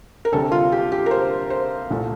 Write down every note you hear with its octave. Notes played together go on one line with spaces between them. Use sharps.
A#4
D2 C3 G3 A4
F4
G4
G4
A#4
C5
C5
C2 A#2 A3